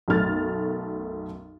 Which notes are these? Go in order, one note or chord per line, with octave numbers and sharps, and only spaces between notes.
B1 F#2 A3 F6 A6